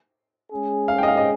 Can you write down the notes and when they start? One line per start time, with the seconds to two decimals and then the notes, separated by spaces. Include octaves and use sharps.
0.51 G#3 C#4 G#4
0.88 F5
0.98 G5
1.03 D#5
1.08 F5
1.17 D#5